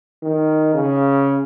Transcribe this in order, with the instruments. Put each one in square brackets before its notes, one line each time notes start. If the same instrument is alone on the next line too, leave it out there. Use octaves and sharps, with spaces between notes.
[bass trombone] D#3
C#3